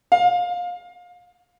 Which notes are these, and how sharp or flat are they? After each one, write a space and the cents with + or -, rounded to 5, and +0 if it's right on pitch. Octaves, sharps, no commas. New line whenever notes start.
F5 +25